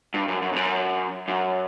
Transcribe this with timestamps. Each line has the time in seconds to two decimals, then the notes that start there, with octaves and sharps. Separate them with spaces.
0.14 G2
0.28 F#2
0.42 F#2
0.53 F2
0.56 F#2
1.28 F#2